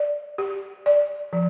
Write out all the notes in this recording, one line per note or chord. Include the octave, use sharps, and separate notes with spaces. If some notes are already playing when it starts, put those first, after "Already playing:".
Already playing: D5
G4
D5
F3